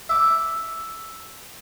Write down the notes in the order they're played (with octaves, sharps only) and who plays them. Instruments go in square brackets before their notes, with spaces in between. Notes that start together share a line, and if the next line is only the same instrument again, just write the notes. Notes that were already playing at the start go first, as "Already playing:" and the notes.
[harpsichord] E5 D6